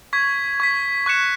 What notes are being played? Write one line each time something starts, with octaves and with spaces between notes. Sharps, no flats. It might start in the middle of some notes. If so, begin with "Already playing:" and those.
C#6 G#6 B6
C#6 G#6 B6
C#6 F#6 C#7 E7